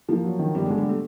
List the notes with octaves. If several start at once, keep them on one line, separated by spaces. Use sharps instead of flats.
F3 A#3
F#3
D#3
G1 G3
D3 G#3
G3
A3